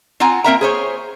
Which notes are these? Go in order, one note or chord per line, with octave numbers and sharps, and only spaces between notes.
C4 F4 F#5 G#5 A#5
A#3 C4 A#4 E5 G5 A#5
G#4 C5 C#5